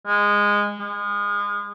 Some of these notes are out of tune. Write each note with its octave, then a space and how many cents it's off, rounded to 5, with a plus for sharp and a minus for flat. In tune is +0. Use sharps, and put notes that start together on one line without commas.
G#3 -15
G#3 -30